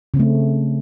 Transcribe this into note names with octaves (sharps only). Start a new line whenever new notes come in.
C#3 A3 C4